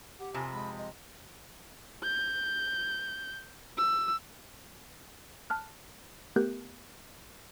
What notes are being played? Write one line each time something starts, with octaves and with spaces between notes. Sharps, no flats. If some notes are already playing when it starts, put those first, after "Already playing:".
G4 F#5
F2 C3 F3 G#5
G#3 B5
D#5
G6
E6
A5 F6 F#6
A3 B3 G4 A#4 F#6 G6